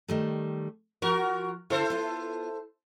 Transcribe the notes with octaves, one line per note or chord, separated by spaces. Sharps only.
D#3 G3 A3
F3 F#4 A#4
D3 E4 A4 C5
B3 F4